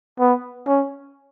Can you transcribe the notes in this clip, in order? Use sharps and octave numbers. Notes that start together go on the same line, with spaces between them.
B3
C#4